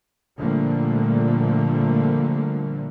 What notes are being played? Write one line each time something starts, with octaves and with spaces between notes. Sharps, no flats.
A#2 D3 F3 G3 A3 A#3